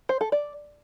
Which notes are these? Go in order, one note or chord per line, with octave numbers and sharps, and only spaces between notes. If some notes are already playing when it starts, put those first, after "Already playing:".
C5
A4
D5